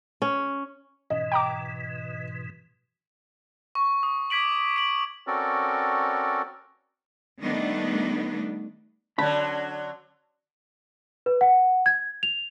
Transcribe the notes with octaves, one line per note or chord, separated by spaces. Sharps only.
C#4
G#2 B2 E3 D#5
G5 A#5 D6
C#6
D#6
D6 G#6 B6 D7 F#7
D7 F#7
C4 C#4 F#4 A4 A#4 D5
D#3 G3 A3 B3 D4 D#4
D3 F#3 C#4 D5 A5 B5
B4
F#5
G#6
F7